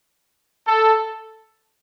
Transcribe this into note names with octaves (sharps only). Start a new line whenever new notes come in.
A4